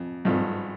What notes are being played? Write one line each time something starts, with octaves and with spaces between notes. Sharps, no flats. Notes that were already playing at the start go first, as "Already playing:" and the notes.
Already playing: F2
G#1 G2 F3